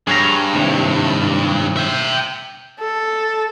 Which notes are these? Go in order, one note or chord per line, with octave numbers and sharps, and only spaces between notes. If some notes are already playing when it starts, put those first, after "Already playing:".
G2 G#4 C#5 A#5
D#2 A2 C3
E5 G5
A4